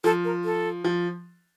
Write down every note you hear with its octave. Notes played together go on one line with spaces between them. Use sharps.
F3 A4
A#4
A4
F3